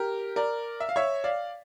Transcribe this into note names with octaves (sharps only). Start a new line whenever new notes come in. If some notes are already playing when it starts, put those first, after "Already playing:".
Already playing: G4 A#4
A#4 D5
E5
F5
C#5 E5
D5 F5